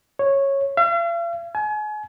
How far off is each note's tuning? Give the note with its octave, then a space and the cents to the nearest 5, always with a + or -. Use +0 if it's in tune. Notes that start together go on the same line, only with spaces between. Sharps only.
C#5 -10
F5 -45
G#5 +35